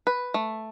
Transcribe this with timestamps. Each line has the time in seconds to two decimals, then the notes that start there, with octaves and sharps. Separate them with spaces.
0.07 B4
0.34 A3